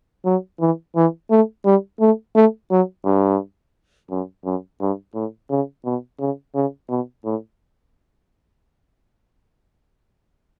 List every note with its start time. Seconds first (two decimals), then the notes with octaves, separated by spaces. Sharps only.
0.25 F#3
0.60 E3
0.96 E3
1.30 A3
1.65 G3
2.00 A3
2.35 A3
2.70 F#3
3.05 G2
4.10 F#2
4.44 F#2
4.80 G2
5.14 A2
5.50 C#3
5.85 B2
6.19 C#3
6.54 C#3
6.89 B2
7.24 A2